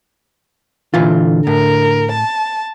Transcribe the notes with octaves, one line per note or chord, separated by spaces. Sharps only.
A#2 D3 E3 F4
A2 A#4
A5